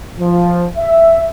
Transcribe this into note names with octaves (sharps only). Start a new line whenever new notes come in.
F3
E5